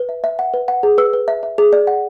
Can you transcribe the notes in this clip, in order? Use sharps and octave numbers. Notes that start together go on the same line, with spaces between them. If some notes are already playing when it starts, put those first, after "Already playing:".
Already playing: B4
E5
E5
F#5
B4
F#5
G#4
B4 E6
B4
E5
E5
G#4
D5
F#5